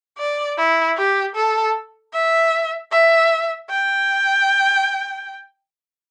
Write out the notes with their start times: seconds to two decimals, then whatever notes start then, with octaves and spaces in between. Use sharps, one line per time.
0.18 D5
0.58 E4
0.97 G4
1.35 A4
2.13 E5
2.91 E5
3.70 G5